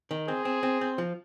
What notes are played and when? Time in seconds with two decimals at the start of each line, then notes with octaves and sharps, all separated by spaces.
0.11 D#3
0.27 C4 G#4
0.45 C4
0.63 C4
0.81 C4
0.98 F3